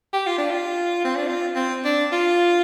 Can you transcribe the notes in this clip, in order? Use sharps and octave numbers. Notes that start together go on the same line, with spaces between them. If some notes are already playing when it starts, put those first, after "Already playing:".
G4
F4
D4
F4
C4
D4
F4
C4
D4
F4